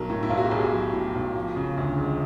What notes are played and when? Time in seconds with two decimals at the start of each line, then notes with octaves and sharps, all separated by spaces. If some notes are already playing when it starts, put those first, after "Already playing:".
Already playing: B1 F#3 A#4
0.10 A2
0.23 E4
0.29 B1 F4
0.37 F#4
0.44 G4
0.51 B1 G#4
0.72 F#3
0.93 A2
1.15 B1
1.36 F3
1.56 C#3
1.78 D2
1.98 E1